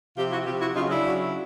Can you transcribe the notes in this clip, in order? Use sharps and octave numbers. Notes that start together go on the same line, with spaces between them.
C3 F3 F4 G4
E4 F#4
C3 F3 F4 G4
E4 F#4
C#3 F#3 D#4 F4
D4 E4
C#3 F#3